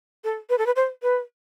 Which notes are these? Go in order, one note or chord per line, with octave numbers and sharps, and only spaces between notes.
A4
B4
A4
B4
C5
B4